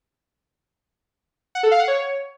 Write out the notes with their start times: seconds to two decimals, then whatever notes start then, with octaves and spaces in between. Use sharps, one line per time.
1.55 F#5
1.63 A4
1.71 F5
1.80 F#5
1.88 C#5